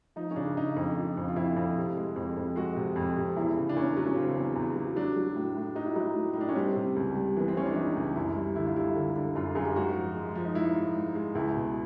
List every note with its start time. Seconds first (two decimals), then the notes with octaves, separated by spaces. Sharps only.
0.16 F3 D#4
0.31 C#4
0.36 C#3 D4
0.57 C#3 D#4
0.76 F2
0.96 F3
1.17 F2
1.28 F4
1.36 F2 E4
1.56 F2
1.77 C3
1.97 G#3
2.16 F2
2.36 F2
2.56 G#3 F#4
2.77 C3
2.96 F2
3.16 C3
3.36 E2 E4
3.56 C#3
3.69 D4
3.76 E2 C#4
3.97 F#3
4.06 C#4
4.16 C#3 C4
4.36 E2
4.56 E2
4.76 F#3
4.96 F#3 D4
5.16 F#3
5.36 A2
5.56 A2
5.75 F#3 D#4
5.86 E4
5.95 F#3 D#4
6.15 A2
6.33 A2 D#4
6.41 D4
6.49 C#4
6.56 G3 C4
6.76 C3
6.96 C#2
7.15 G3
7.37 E3 B3
7.48 C4
7.56 E3 C#4
7.66 D4
7.75 E3 D#4
7.96 C#2
8.16 F#2 E4
8.36 G3
8.56 D3 E4
8.66 F4
8.75 G3 E4
8.95 D3
9.16 D3
9.35 F#2 F4
9.55 F#2 G#4
9.65 G4
9.76 G#2 F#4
9.96 F3
10.16 G#3
10.35 F3
10.45 D#4
10.55 G#2 E4
10.75 F3
10.96 G#2
11.15 G#3
11.35 C#2 E4
11.56 B2